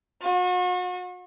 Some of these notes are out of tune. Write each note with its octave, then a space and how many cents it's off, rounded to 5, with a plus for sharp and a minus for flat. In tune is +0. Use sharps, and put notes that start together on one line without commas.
F#4 -40